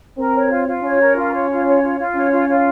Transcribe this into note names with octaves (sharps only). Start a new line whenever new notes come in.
C4 A#4
C#5
F4
F4
C#4 C#5
A#4
F4
C#5
F4
C#5
F4
F4
C#4 C#5
F4
F4